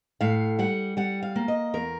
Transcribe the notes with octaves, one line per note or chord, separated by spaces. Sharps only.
A2 F5
G3 F#5
G3 F#5
F5
A#3
D#5
E2 A#4